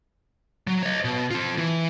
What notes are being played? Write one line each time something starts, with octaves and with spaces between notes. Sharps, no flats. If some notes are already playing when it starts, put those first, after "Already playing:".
F#3
C#5 D#5
B2
C4 F4
E3